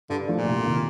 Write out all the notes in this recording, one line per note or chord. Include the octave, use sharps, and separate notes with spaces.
G2 D3
F3 A3 D4
A#2
C2
C3 D#3 A#3